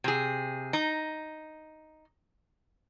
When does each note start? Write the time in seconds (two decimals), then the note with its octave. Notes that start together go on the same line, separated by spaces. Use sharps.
0.04 C3 G#4
0.73 D#4